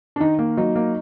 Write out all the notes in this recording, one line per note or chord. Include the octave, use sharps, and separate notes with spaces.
D4
D#3 D#4
A#3
F#3 D#4
A#3